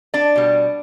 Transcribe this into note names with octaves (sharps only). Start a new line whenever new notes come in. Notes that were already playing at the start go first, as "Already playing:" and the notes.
D4 D5
B2 G3